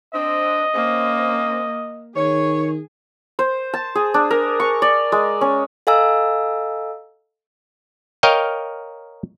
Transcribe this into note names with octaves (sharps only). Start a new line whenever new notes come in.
C4 D4 D#5
A#3 C4 C#4
D#3 G#4 C#5
C5
A5
G#4
D4
A#4
C#6
D5
G#3
C#4
A4 D#5 F5 G#5 A#5 E6
A#4 C#5 D#5 F5 G5